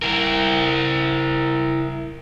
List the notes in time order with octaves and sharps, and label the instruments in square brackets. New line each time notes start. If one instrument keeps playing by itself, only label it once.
[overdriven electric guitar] E4 A#4